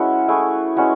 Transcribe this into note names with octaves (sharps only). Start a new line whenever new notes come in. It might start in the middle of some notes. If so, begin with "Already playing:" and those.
Already playing: G#3 C#4 E4 F#4 B4
A3 E4 G#4
G#3 C#4 F#4 B4